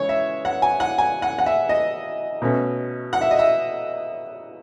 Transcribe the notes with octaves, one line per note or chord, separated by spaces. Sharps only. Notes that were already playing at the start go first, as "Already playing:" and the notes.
Already playing: C#3 E3 G#3 C#5
E5
F#5
G#5
F#5
G#5
F#5
F#5
E5
D#5
B2 A3 C#4
F#5
E5
D#5
E5